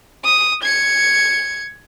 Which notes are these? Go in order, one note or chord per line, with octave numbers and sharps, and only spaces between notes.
D#6
G#6 C#7